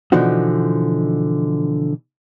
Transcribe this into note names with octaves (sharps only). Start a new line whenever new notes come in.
B2 D3 E3 F3 D#4 F#4